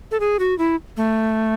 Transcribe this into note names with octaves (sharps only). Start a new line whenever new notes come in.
A4
G#4
F#4
E4
A3